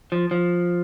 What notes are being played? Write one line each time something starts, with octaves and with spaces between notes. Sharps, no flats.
F3
F3